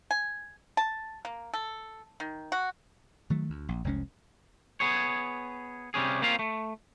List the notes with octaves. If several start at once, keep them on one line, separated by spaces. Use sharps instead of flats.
G#5
A5
A#3
A4
D#3
F#4
D#3 F#3 A3
D2
A#1
F1 C2 G#3 C#4
B3 G#4 C#5
C3 G3 C#4 G#4
A#3 C4 C#4 F4 F5
A3